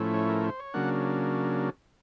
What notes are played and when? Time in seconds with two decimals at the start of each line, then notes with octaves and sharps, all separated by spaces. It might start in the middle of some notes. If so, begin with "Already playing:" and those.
Already playing: A2 F3 A3 C#4 E4
0.14 C#5
0.29 A#4
0.45 C5
0.60 C#5
0.74 C#3 F#3 A#3 D4 F#5